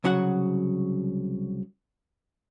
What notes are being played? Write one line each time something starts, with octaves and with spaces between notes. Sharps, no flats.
C2 C#3 F#3 F#4 F#5